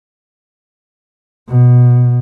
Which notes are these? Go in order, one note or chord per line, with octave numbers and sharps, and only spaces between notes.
B2